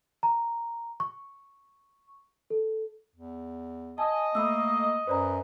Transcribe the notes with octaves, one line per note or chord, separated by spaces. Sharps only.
A#5
C#6
A4
E2
D#5 G#5 A5
A3 A#3 B5 D#6 E6
F#2 B4 C5 D5 A#5